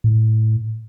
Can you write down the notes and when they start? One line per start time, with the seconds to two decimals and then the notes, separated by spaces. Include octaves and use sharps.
0.04 A2